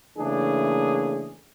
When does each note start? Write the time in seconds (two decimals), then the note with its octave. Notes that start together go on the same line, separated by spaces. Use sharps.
0.18 C#3 E3 A3 A#3 D4 G#4